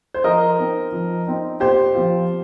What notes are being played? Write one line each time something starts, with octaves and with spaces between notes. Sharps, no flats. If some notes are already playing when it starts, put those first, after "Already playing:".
C5
F3 A#4 D#5
C4 D#4
F3
C4 D#4
A#2 G4 C5
F3 C4 F4